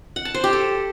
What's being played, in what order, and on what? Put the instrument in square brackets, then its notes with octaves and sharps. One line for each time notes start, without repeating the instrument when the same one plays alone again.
[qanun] F#5
A5
C5
G4
A4